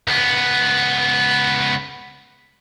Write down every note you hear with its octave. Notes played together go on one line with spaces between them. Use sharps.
C#2 B3